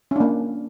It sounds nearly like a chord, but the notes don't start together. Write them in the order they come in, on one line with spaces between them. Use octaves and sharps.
C#4 D4 A#3